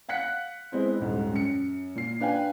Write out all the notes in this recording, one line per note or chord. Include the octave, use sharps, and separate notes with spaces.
F5 F#5 F#6 B6 C#7
G#3 B3 C4 E4
D#1 G#2
F#2 C#7
A#2 C7
D4 B4 F5 G5 G#5